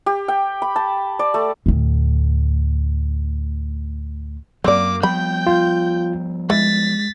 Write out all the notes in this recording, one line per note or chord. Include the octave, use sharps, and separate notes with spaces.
G4
G5
B5
A5
D5
A3
D2 A2
F#2 F#3 A#3 C4 D5 D6
F3 G3 B3 G5 B5 G6
F4
E3 G#3 A6 B6